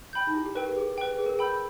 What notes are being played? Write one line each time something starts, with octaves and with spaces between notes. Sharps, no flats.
G5 B5 G6
D#4
E4 G4
G4
A#4 B4 G5
G4
G4 G#4
B4 G5
G#4 B4
A#4
G#4
G5 B5 E6 G6